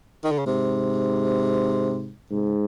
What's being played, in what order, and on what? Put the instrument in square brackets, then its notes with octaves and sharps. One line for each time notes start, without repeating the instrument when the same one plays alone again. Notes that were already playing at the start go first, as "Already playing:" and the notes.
[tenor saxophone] D#3
D3
C#3
[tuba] G#2 [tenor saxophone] C3
[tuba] G#2 [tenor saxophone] C3
[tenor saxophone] C#3